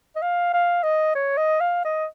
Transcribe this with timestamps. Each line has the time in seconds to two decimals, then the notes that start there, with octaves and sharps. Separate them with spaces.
0.16 D#5
0.22 F5
0.53 F5
0.83 D#5
1.15 C#5
1.37 D#5
1.60 F5
1.85 D#5